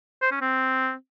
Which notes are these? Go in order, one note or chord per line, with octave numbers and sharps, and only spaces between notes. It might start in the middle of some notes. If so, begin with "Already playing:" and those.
C5
C#4
C4